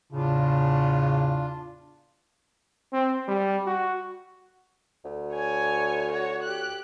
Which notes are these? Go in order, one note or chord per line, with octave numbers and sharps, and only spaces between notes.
E2 A2 C#3 D4 F4
C4
G3
F#4
D2
C#5 G#5
F#4 C#5
G4 F#6